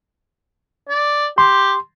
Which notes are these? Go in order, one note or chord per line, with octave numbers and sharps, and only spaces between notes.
D5
G4 C6